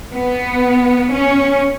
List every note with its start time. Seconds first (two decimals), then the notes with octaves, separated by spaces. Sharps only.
0.13 B3
1.12 C#4